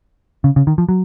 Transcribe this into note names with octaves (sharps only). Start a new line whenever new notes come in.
C#3
C#3
D#3
F3
F#3